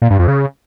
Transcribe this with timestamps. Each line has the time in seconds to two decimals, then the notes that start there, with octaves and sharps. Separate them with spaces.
0.02 A#2
0.10 G2
0.19 F2
0.28 C#3